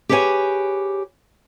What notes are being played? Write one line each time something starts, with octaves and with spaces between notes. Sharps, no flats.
G4 G#4 B4 C#5 G5 G#5